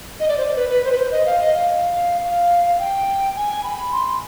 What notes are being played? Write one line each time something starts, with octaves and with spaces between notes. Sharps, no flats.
D#5
D5
C5
D5
B4
B4
C5
B4
C5
D#5
F5
D#5
F5
F5
F5
G5
G#5
B5
C6